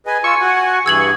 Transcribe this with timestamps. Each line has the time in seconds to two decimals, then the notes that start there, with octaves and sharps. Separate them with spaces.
0.06 G#4 B4 D#5 G#5
0.24 F4 C#6 E6
0.41 F#4 F#5
0.86 G2 E3 G#4 E6 G#6 F#7